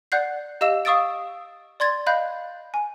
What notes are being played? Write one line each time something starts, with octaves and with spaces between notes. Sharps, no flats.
D5 F#5 F#6 G6 C7
G4 D#5 F5 E6 E7
F5 C#6 D#6 E6 A6 D7
D5 C6 G#6 A6
D#5 F5 B5 F#6 G6
G#5